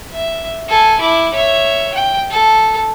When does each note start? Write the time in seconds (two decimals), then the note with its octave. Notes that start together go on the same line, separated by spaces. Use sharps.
0.13 E5
0.68 A4 G#5
1.00 E4 D6
1.33 C#5 E5
1.94 G5
2.30 A4